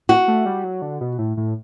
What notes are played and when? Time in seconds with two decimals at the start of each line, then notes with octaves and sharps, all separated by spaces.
0.09 F#4
0.28 A3
0.46 G3
0.64 F#3
0.82 D3
1.01 B2
1.18 A2
1.37 A2